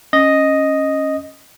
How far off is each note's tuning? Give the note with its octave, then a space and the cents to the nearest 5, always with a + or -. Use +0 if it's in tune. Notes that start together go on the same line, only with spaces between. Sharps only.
C#4 -15 D#5 +0